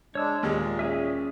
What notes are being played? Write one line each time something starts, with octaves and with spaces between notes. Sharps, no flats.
G#3 D4 C#5 E6
D#2 A#2 G#3 G4
C#4 G#4 E5